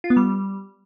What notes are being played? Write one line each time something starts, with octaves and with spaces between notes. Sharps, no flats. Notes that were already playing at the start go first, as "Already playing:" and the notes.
F4
B3
G3